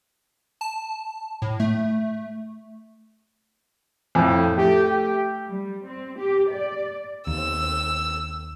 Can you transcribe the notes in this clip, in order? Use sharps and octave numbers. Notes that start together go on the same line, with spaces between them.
A5
A2
A3
F2 A2
A3 G4
G4
G3
C4
G4
D5
D#2 E6